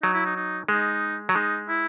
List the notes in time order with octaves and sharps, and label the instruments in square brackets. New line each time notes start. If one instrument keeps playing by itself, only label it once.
[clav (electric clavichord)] F#3 [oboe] D#4
[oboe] E4
D#4
D#4
[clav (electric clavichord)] G#3 [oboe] D#4
[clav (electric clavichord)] F#3
[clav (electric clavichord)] G#3 [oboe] D#4
[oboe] E4